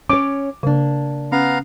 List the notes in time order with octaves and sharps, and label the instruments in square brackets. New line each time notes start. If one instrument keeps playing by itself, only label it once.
[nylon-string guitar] C#4 C#5 [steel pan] D6
[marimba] C#3 [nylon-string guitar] A#3 D4
[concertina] B3 F5 A#5 [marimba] C#4